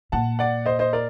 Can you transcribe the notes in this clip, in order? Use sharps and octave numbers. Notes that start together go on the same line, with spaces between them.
A#2 F#5 A5
D5 F#5
C5 D#5
C5 D#5
A#4 D5